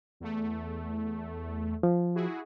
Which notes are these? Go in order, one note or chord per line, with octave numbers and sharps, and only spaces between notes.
E2 A3
F3
E4 F#4 G#4